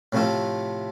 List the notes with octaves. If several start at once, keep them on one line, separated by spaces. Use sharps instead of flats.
A2 C3 F3 A3 A4